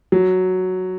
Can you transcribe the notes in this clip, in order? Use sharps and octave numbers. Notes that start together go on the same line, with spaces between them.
F#3